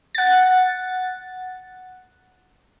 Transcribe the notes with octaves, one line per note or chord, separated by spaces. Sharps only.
F#5 A6